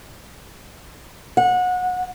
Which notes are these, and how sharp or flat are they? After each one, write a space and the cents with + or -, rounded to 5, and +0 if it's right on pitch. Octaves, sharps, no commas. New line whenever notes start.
F#5 -25